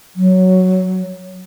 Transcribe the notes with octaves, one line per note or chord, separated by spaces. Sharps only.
F#3